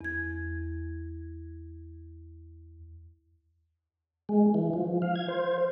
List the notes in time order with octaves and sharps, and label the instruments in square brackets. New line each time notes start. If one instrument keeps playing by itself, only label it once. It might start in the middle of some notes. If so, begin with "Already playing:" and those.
[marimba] E2 G#6
[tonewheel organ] G#3
E3
F3
F5
G#6
C5